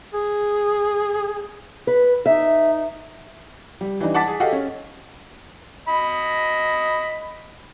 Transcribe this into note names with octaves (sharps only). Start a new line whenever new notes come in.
G#4
B4
D#4 E5
G3
E3 G3 D4 D#4
F#5 A5 D6 A6 B6
G#4
F#4 G4 A4 D#5 F5 F#5
C#4
D#5 B5